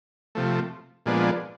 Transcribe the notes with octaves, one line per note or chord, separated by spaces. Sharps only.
C3 F3 A3
A#2 F3 G#3 B3 D4